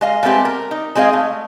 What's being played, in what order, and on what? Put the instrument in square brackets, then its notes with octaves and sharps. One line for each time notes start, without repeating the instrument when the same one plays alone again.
[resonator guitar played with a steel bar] G#3 D#5 F5
G#3 A3 B3 C4 G4
A#4
D#4
G#3 C4 G#4 D#5 F5
A3